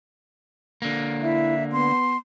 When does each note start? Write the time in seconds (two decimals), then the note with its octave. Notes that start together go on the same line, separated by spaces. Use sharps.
0.82 D3 A#3
1.22 E4 E5
1.72 B3 C6